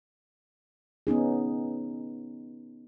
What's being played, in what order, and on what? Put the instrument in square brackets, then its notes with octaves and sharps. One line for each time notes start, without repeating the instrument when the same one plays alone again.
[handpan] B3 C#4 D#4 G#4